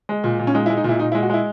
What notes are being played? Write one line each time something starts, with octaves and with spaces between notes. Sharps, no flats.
G#3
A#2
A#2
C#4
G#3 D#4
E4
G#3
D#4
A#2 E4
A#2 D#4
E4
G#3
F#4
G#3 E4